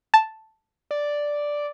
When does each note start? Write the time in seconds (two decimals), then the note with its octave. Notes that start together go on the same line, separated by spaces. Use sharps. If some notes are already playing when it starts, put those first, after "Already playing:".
0.14 A5
0.91 D5